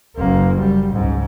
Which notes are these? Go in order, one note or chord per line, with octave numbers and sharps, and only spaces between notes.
F#1 A#3
G3
C#2 G#2